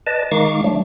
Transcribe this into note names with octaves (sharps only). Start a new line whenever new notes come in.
B4 D5 D#5 A5
D#3 G#3 D#4 F5 C#6 D6
F#3 G3 A3 D4